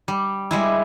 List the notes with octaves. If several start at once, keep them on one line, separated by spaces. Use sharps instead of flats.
G3
G3 G#3 E4